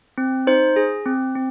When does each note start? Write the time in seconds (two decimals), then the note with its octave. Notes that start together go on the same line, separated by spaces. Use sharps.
0.18 C4
0.47 D#4 C5
0.76 G#4
1.06 C4
1.35 C4